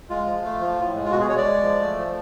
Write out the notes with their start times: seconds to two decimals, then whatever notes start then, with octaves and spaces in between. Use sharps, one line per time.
0.10 G#3 F4
0.26 F3
0.44 A3
0.61 F3
0.78 A2
0.95 G#3
1.05 F4
1.11 B2 F#4
1.21 G#4
1.29 G#3 C#5
1.37 D5
1.46 G#3
1.63 F3
1.80 A3
1.97 F3